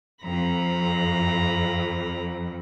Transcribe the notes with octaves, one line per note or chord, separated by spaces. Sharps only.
F2 A#5 B5